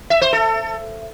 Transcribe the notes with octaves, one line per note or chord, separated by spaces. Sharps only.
E5
C5
A4